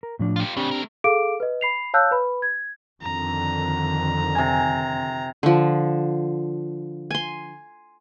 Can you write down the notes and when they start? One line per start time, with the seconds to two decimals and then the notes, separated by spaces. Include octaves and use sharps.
0.03 A#4
0.19 A2 F3 D4
0.36 F4 G4
0.57 A2 C#3 C4 D4 G4
0.71 A3 A#4
1.04 G#4 A4 F5 D6 D7
1.40 B4 D#5
1.61 B5 C7 F7
1.94 C#5 F5 A5 E6 F#6 G6
2.11 B4 B5
2.42 G#6
3.02 F2 D3 D#3 A#5
4.35 C3 G#5
5.43 D3 F3
7.10 G#5 C6